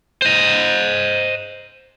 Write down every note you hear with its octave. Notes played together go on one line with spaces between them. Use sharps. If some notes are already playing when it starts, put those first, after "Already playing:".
C5 D#5